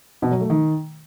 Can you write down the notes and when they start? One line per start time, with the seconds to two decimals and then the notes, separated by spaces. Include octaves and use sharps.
0.22 B2
0.32 F#3
0.41 A3
0.50 D#3